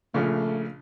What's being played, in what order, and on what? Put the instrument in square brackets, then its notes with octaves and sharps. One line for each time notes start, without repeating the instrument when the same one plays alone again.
[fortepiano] A#1 A#2 C#3 [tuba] A3